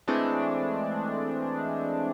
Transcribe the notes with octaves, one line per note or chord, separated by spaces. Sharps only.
E3 G#3 A3 C4 D4